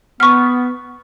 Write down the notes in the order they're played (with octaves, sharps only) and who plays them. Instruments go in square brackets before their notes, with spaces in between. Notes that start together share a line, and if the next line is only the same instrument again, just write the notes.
[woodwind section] B3 [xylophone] C#6 F6